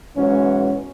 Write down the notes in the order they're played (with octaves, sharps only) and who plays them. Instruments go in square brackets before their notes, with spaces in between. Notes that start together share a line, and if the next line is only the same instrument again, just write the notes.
[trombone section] B1 G#2 B2 E3 C#4 F#4